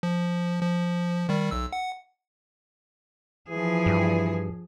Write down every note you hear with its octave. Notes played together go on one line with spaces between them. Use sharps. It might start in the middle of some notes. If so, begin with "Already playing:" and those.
F3
F3
D#3 G3
B1 E6
F#5
E3 F3 G#4
G2